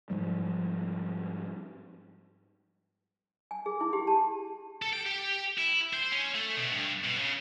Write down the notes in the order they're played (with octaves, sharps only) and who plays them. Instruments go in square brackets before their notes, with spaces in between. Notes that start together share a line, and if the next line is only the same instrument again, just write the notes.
[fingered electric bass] G#2 F3 G3
[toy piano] G#5
G#4
E4
G4
A5
[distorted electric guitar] A4
G5
G4
E4
C5
C#4
A3
B2
G2
B2
C#3